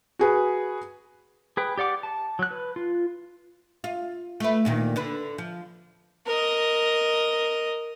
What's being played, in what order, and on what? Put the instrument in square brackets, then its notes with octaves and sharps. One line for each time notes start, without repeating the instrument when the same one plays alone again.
[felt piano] F#4 G#4 B4
[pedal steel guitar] G#4 B4 G5
G4 D5 F#5 D6
A5
F#3 F#6
B4
F4
[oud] F4
A3 B4
D2 A#2 D#3
D3 D4 B4
F3
[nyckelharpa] A#4 D#5